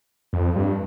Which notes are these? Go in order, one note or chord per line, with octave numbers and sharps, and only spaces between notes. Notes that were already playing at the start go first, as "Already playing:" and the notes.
F2
G2